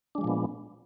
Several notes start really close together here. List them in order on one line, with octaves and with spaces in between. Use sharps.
D4 G#3 F3 A#2 B3